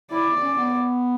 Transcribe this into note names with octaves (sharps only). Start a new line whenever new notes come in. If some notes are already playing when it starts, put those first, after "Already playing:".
E4 D5
C#4
B3